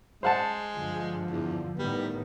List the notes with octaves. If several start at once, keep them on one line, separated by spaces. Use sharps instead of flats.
G#3 C5 F#5 A5
G2 D3 F3
E2
A2 D#3 G3 B3